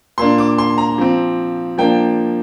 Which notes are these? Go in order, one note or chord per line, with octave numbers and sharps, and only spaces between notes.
A#2 A#3 D4 C6
D6
C6
A#5
F3 C4
F3 A#3 D4 G5